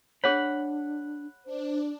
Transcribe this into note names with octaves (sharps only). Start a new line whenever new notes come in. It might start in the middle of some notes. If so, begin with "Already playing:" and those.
D4 G#4 C#5 F#5 B5
D4 C5